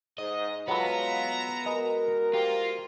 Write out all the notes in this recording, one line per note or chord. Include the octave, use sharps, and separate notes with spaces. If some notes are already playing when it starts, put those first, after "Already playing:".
G#2 D#5
F#3 G#3 B3 F4 A4 B4 E5 A#5
G#3 F#4 G#4 A#4 B4 D#5
A#3 F4 G4 C5 A#5 C6